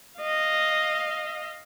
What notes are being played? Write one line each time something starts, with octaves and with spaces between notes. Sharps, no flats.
D#5 F5